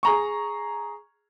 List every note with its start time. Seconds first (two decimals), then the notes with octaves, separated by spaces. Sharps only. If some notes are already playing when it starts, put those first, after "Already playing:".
0.03 G#4 A#5 C#6